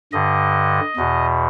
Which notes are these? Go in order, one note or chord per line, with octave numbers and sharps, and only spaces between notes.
G2 D3 D#5
E2 B2